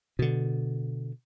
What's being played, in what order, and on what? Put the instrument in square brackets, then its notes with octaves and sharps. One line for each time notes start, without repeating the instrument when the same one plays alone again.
[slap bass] B2 D3